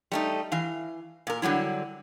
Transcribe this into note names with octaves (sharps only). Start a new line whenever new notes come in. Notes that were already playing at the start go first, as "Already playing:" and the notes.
G3 A3 D#4
E3 F5
A#2 A#4
D3 F#3 G3 E4